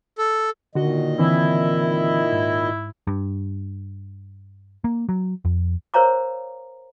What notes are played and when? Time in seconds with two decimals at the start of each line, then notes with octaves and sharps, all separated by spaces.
0.18 A4
0.75 A#2 D3 D#3 F#4 D#5
1.19 D3 E3 C4 E4
2.32 G#2
3.07 G2
4.84 A#3
5.09 F#3
5.45 F2
5.94 A#4 C5 C#5 F5 A#5 D6